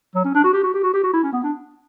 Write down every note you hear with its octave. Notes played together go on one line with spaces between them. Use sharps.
F#3
C#4
D4
F#4
G4
F#4
G4
F#4
G4
F#4
E4
C#4
B3
D4